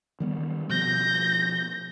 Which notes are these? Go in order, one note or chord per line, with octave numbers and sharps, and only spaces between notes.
D#3 G3 B3
B2 F3 B3 G6 A#6